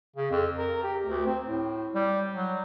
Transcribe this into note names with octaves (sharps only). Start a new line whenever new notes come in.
C#3
F2
A#4
G4
D2
C4
A2
G3
F#3